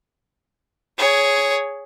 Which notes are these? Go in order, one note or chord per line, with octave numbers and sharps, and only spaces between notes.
G#4 C#5